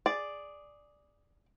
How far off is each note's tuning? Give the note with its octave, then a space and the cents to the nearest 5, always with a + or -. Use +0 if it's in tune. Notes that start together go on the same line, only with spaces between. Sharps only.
G#4 +0 D5 +0